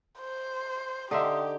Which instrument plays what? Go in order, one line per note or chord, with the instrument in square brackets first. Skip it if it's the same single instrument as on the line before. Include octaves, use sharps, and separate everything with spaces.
[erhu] C5
[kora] D3 D#4 [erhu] G4 [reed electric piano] E5 C6 D#6